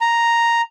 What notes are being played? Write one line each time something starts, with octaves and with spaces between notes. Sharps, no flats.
A#5